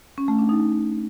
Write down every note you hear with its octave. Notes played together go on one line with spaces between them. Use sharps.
C#4
A3
D4
D#4